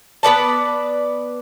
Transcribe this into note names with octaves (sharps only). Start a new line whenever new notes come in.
B3 B4 D5 A5